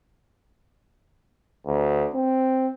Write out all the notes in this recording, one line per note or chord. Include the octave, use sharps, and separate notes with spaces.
D2
C4